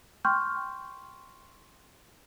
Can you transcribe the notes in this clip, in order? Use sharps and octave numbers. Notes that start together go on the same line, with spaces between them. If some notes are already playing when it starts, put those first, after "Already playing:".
G5 C6 C#6 F6 G6